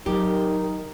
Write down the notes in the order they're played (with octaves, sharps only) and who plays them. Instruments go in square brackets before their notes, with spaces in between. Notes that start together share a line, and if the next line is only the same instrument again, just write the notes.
[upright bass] F#3 [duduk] D#4 [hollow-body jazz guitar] G4 [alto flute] A#4